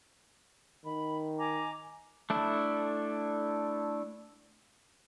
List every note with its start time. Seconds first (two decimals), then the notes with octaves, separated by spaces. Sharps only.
0.85 D#3 B5
1.38 G#5 A#5 D6
2.30 A3 D4 E4